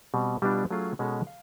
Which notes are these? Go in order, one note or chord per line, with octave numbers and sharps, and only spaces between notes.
B2 G3 C4
B2 G3 B3 D4 F4
F#3 A3 C#4 F4 G#4
B2 G#3 C#4 F#4 A4
F5